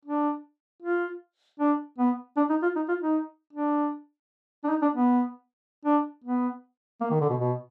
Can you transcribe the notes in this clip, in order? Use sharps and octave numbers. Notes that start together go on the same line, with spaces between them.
D4
F4
D4
B3
D4
D#4
F4
D#4
F4
D#4
D4
D4
D#4
D4
B3
D4
B3
A#3
D#3
D3
B2
B2